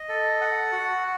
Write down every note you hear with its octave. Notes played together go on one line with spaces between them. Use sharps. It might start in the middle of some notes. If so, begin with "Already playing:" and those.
Already playing: D#5
A4
F#5
F#4